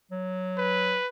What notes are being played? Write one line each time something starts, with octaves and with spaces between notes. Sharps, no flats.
F#3
B4